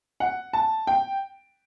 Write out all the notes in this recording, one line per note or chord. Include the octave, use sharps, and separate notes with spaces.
F#5
A5
G5